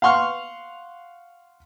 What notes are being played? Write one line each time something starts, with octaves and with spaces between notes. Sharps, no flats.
F5 F#5 C6 C#6 F6